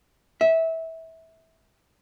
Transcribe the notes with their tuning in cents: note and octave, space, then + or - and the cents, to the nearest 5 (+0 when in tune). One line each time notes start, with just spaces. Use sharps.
E5 -20